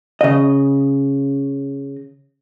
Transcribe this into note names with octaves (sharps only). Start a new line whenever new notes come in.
C#3 D#5